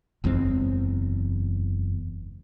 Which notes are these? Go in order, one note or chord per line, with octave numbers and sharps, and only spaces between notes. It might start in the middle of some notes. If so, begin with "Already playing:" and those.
F#1 E2 G#3 C4